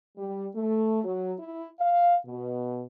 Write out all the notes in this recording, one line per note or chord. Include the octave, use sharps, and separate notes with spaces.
G3
A3
F#3
E4
F5
B2